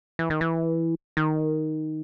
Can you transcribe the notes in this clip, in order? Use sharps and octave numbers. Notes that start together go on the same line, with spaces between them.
E3
D#3
E3
D#3